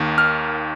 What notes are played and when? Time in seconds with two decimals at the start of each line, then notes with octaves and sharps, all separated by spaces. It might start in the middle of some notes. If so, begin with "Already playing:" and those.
Already playing: D#2 D#3 A#3
0.18 F6